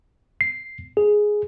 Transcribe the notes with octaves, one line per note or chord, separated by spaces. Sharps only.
C7
G#4